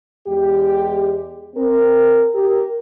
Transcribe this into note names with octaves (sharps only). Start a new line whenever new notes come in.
E2 G#3 G4
C4 A#4
G4 A#4